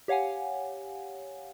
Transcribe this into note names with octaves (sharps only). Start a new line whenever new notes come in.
G4 C#5 F5 F#5 G#5